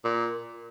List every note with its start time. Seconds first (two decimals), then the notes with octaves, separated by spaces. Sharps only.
0.05 A#2